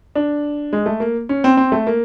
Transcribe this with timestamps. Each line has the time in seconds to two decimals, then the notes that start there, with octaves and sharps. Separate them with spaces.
0.15 D4
0.73 G#3
0.86 A3
1.00 A#3
1.29 C#4
1.44 C4
1.57 C4
1.72 A3
1.87 A#3